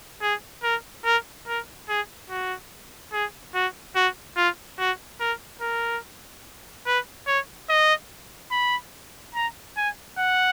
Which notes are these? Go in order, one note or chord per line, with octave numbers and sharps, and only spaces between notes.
G#4
A#4
A#4
A#4
G#4
F#4
G#4
F#4
F#4
F4
F#4
A#4
A#4
B4
C#5
D#5
B5
A#5
G#5
F#5